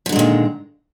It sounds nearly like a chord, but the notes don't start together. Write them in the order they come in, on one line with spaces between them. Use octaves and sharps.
F3 D3 G#3 A#2 D#3